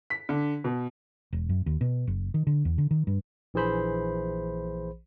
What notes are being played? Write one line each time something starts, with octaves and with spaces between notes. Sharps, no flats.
B6
D3
B2
E1
F#2
D#2
B2
F#1
D#3
D3
E2
D3
D#3
G2
A#1 E3 G#4 C5 B5